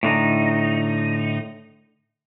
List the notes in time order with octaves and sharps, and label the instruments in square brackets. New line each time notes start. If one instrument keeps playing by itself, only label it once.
[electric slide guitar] A2 D3 D#4